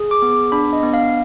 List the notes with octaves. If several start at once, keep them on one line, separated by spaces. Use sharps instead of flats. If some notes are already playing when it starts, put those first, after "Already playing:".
Already playing: G#4
D6
B3
D6
D4 B5
D#5
B3
F5